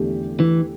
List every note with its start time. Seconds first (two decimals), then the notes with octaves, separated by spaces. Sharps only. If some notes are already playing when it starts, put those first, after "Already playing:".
Already playing: E2 D3 A3 G4
0.40 E3